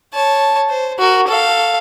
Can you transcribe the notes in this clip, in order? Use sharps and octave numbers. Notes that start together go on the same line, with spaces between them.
C#5 A5
C5
F#4 A#4
A4 F5